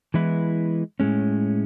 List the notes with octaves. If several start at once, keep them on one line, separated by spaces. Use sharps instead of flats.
E3 G#3 B3 E4 B4
A2 G#3 C#4